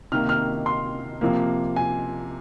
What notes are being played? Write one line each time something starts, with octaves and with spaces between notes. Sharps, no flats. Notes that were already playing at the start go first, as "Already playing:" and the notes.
C3 D#3 A#3 F6
F6
C6
C3 F3 A#3
G#5